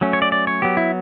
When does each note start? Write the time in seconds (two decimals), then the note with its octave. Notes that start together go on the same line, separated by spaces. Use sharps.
0.01 F#3 A3 C#4
0.13 C#5
0.22 D5
0.32 D5
0.47 C#5
0.62 F#3 B3 G4
0.77 E4